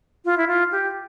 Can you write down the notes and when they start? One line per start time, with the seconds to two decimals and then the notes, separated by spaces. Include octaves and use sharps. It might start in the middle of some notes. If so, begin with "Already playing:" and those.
0.25 F4
0.37 E4
0.48 F4
0.72 G4